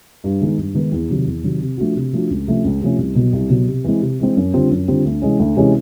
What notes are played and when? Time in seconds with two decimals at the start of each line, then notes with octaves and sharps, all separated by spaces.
0.24 G2
0.41 D#3 G#3 B3 D#4
0.58 G2
0.75 D#3 G#3 B3 D#4
0.92 E2
1.10 C3 D#3 F#3
1.26 E2
1.43 C3 D#3 F#3
1.61 C3
1.78 F3 A3 D4 F#4
1.96 C3
2.13 F3 A3 D4 F#4
2.30 C#2
2.47 C3 F3 A3 C#4
2.65 C#2
2.81 C3 F3 A3 C#4
2.98 C2
3.15 B2 F#3
3.33 C2
3.50 B2 F#3
3.68 C3
3.84 E3 G#3 C4
4.01 C3
4.19 E3 G#3 C4
4.37 F#2
4.54 D3 G3 C4 F4
4.71 F#2
4.88 D3 G3 C4 F4
5.05 D2
5.22 C3 E3 G#3 C#4
5.39 D2
5.57 C3 E3 G#3 C#4